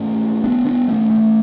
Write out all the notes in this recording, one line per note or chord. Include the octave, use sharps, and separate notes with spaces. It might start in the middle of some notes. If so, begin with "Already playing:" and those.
Already playing: G#2 A3 C#4
B3 D4
B3 D4
A3 C#4
A3 C#4